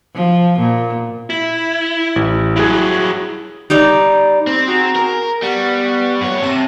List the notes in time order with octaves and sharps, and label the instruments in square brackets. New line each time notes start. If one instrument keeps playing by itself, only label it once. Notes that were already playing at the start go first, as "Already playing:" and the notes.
[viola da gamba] F3
A#2
[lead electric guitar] E4
[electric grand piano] A1
[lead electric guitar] G2 F#3 [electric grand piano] E4 G#4
[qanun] G3 D#4 D5
[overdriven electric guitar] C4
[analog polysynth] F#4 G#4 A#5
[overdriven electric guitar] A#4
[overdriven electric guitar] G3 [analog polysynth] B3 F#5 C#6
[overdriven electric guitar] G2 C#5
[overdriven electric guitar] C3 [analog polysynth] A5 D#7